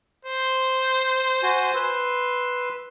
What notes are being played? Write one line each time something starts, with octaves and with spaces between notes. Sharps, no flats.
C5
F#4 G#5
B4 C6 E6